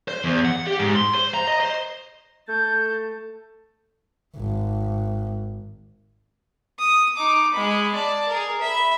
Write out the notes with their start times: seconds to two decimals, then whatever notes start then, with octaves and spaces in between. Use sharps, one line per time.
0.08 C5
0.24 E2
0.45 F#5
0.67 G4
0.79 G#2
0.96 C6
1.14 C5
1.34 A#5
1.47 D#5
1.60 C5
2.48 A3 A5 G6
4.37 G#1
6.79 D#6
7.17 D#4 D6
7.53 G#3 B5
7.95 D5 A5
8.29 G#4 A#4
8.61 E5 B5